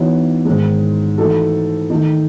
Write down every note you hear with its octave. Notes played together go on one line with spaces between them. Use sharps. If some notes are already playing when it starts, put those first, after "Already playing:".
Already playing: E3 B3 D#4 F#4 C#5
G#2 D#3 G#3
E3 A3 D#4 F#4 A4
D#3 A3 D#4